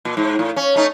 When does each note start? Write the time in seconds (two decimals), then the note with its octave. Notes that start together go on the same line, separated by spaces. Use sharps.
0.05 A#2
0.17 G#2
0.39 A2
0.56 C#4
0.76 A3 C#4 D#4